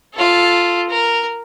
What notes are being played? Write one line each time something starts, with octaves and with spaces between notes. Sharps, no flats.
F4 A4
A#4